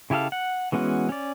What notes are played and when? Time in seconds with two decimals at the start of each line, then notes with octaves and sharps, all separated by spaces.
0.10 C#3 E4 G4 A4 F5
0.32 F#5
0.72 E3 G#3 B3 C#4 F#4
1.09 C#4 D5